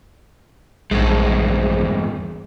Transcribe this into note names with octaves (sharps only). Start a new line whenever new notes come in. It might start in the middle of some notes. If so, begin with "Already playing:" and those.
A#1 E2 G2 G#3